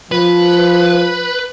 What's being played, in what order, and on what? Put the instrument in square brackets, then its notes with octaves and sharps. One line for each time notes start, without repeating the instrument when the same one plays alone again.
[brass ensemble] F3 [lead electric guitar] B4